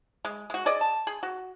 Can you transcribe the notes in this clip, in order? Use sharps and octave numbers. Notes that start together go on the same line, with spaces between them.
G#3
G#3 F#4
G#4 D5 D#5
A5
G#4
F#4